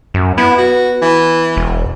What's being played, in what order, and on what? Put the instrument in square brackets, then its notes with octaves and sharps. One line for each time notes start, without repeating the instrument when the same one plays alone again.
[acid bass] F#2
[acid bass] B3 [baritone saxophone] E4
[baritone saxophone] F#4
E3
[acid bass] E1